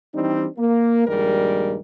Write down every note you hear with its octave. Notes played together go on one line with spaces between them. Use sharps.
E3 G3 C4 D4 D#4
A#3
A#1 G2 D#3 G3 G#3 A#4